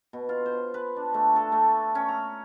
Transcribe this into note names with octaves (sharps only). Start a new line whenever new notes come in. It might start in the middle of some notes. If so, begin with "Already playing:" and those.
B2
F4
C5
B4
D4
A3
A4
A3
C#4
A#5